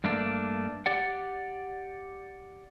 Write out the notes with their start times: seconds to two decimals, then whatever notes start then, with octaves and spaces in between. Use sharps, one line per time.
0.04 G2 A3 A#3 D4
0.86 G4 D5 F#5